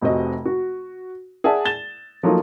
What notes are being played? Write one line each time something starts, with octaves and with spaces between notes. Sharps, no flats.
F1 C3 F#4 D#5
F#4
G#4 D5 E5 F#5 A5
A6 E7 G7
F3 F#3 A3 A#3 D#4 F4